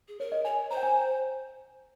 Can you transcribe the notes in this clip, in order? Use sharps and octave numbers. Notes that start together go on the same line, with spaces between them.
G#4
A#4 C#5
D#5
C#5 G#5
C5 A#5
G5
G#5